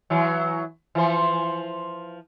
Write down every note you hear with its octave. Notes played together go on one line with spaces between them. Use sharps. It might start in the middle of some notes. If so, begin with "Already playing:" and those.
E3 F#3
E3 F3 C5